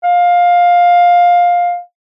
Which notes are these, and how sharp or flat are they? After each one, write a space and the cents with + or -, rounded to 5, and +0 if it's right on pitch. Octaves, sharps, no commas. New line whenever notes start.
F5 +15